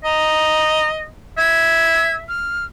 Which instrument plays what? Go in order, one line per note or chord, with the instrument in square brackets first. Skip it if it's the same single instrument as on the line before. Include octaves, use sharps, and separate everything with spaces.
[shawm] D#5 [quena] A#5
[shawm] E5 [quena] G#6
[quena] F6